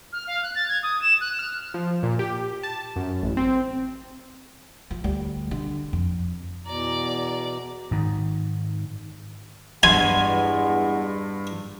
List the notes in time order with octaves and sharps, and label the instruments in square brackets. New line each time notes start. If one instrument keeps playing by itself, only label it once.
[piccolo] F6
F5
F#6
A6
G#6
D#6
E7
F#6
[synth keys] F6
F3
A#2
G4
A5
F#2
A1
C4
[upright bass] F3
D2 G3
D3
F2
[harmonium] E2 B2 A#5 [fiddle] D5
[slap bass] G#2 D#3
[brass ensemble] E2 G#3 F#5 [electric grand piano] G2 C6 [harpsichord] G#5